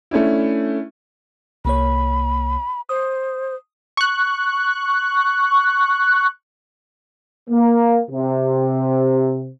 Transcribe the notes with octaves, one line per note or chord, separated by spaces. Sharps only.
A3 C#4 D4 E4
C2 A#3 C#5 B5
C5 D#6
C#6 F#6
A#3
C3